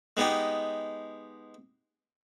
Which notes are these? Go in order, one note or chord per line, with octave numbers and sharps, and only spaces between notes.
G#3 B3 D#4 G4